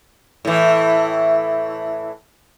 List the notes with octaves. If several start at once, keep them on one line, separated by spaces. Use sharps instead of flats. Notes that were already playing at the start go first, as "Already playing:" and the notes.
A2 E3